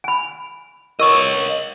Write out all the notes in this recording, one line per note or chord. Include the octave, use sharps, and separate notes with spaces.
G#5 B5
A#4 C#5 D#5 C#6